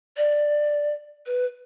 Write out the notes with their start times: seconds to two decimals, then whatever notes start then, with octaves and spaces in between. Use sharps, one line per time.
0.17 D5
1.26 B4